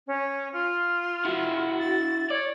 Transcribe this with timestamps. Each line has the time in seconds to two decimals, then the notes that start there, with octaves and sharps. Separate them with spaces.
0.07 C#4
0.53 F4
1.25 E4 F#4
1.79 A6
2.30 C#5 D5